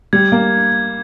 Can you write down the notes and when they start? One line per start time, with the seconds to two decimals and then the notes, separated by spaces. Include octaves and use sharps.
0.13 G3 G#6
0.32 A#3